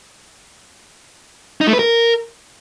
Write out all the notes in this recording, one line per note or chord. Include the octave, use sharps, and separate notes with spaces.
D#4
A3
B4
A#4